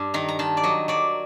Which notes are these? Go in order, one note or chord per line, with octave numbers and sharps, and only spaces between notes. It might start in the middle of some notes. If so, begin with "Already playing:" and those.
Already playing: G2
D#3 A#5
A#5
D#3 A5
D5
F#3 D#5
F#3 D5